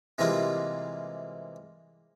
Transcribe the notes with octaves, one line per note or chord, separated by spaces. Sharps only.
C3 E3 G3 G#3 A#3 F4